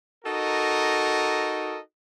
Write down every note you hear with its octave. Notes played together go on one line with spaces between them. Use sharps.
D#4 F#4 A4 A#4 D#5